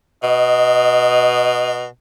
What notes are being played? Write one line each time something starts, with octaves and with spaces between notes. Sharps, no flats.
B2 D#5